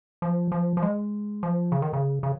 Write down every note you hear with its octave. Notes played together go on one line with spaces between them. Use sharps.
F3
F3
F3
G#3
F3
C#3
D#3
C#3
C#3